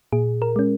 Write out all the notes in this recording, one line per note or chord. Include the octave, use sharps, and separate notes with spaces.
A#2 G#4
A#4
G#3 C#4